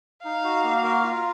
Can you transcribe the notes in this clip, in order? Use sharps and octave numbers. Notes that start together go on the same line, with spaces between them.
D#4 F5
F#4
A#3
A#4
F4